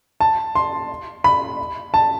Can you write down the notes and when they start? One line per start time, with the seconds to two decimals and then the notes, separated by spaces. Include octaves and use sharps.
0.21 A5
0.55 C6
1.24 B5
1.94 A5